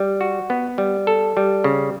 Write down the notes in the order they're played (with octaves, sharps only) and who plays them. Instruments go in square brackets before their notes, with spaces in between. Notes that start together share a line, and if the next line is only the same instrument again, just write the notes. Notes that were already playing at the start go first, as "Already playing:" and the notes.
Already playing: [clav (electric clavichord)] G3
F#4
B3
G3
A4
G3
C#3